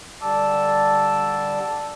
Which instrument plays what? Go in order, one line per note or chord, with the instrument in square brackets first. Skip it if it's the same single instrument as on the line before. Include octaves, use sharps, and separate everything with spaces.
[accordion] D3 G3 A5 D6 E6